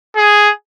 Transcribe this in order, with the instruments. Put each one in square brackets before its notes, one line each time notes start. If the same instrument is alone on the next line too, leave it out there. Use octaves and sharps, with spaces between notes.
[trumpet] G#4